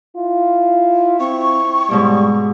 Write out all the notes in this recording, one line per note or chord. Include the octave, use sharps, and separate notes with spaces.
E4 F4
C4 C#6
G#2 B2 G3 D6